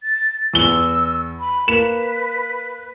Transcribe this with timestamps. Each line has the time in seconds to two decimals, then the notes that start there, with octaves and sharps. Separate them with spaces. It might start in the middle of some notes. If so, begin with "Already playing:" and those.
0.03 A6
0.54 E2 E6 G7
1.40 B5
1.68 A#3 B4 E7